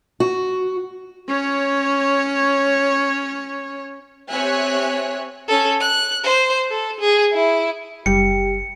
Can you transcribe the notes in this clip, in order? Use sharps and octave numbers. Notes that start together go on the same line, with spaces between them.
F#4
C#4 C#5
C4 G4 C#5 E5 G#5 F#6
C#4 A4
F#6
C5
A4
G#4
E4
F#1 G3 G4 C#7